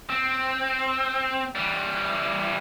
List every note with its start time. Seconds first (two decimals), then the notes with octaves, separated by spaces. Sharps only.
0.10 C4
1.55 E3 G3